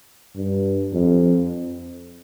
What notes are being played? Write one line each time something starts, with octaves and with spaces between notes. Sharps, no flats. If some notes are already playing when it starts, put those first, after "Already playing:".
G2
F2